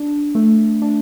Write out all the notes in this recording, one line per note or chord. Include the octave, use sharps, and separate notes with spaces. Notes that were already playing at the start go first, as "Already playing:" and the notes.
Already playing: D4
A3
D4